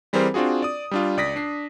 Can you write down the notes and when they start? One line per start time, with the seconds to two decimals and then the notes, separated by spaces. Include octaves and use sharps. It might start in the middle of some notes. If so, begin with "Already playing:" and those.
0.13 E3 G3 C4 G#4 A#4 C5
0.34 C4 D4 F4 F#4 G#4
0.62 D5 D#6
0.91 G3 D4 F4
1.17 C#2 D5 D#6 A#6 B6
1.36 D4 C7